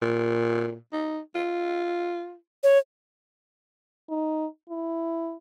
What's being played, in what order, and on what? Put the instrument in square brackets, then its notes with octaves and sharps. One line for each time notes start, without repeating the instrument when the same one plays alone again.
[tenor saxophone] A#2
D#4
F4
[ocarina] C#5
[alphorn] D#4
E4